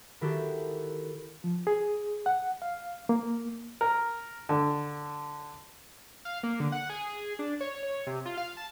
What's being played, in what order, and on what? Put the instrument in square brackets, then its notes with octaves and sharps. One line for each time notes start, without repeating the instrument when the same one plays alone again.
[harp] D#3 E4 F#4 G4 A4
[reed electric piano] F3
G#4
F#5
F5
A#3
[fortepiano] A#4
D3
[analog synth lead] F5
A#3
D3
F#5
G#4
D4
C#5
C#5
C3
F4
F5
A5